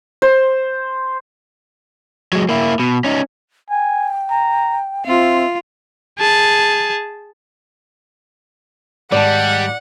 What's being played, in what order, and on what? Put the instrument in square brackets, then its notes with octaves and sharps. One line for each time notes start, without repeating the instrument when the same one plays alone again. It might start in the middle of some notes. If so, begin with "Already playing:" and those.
[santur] C5
[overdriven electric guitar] F#3 G#3
A#3 E4
B2
C#4 D#4
[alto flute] G5 [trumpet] G#5
[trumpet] A#5
[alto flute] C4 [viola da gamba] F4 [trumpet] E5
[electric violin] G#4 A5
[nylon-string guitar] G#2 D#3 A5 [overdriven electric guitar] G3 [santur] D5 [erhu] F#5